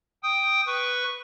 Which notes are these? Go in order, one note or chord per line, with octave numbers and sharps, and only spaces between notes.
G5 D#6
B4 C#6